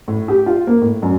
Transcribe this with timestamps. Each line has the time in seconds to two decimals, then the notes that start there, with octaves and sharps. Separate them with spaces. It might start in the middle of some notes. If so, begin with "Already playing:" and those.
0.08 A2
0.28 G4
0.46 F4
0.67 A#3
0.82 A2
1.02 F#2